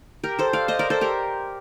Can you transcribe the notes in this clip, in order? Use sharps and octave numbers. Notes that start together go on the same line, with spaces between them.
G4 A#4
A4 C5
D5 F5
C5 D#5
A#4 D5
A4 C5
G4 A#4